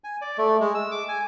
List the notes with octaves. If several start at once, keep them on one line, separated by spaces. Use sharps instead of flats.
G#5
D5
A3
G#3
E6
D6
G#5